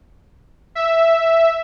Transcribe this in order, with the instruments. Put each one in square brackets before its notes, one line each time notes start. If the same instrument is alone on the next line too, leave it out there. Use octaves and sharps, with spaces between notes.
[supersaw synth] E5